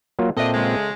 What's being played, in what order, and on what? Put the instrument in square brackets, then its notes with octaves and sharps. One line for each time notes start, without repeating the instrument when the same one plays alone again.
[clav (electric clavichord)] F#3 A#3 F4
[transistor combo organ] A#2 C4 [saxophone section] D4 D#5 [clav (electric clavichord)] A4 E5
[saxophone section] C#3 G#3